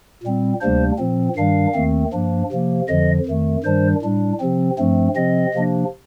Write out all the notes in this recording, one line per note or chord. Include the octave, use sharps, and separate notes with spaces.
A#2 G3 C4
D2 C3 G3 A#3 D4 C5
A#2 F3 C4
G2 D#3 G3 D4 F5
D#2 D#3 A3 C4
G2 F3 A#3 D4
C3 F3 A#3
F2 D3 F3 D#5
F2 D#3 A3
G2 D#3 G3 D4 C5
A2 G3 D4
C3 F3 C4
G2 F3 A3 C4
C3 F3 C4 D#5
C3 F3 A#3 D4